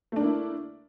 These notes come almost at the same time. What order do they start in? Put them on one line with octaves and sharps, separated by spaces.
A3 D4 A#3 E4